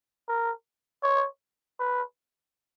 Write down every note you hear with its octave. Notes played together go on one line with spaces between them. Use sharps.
A#4
C#5
B4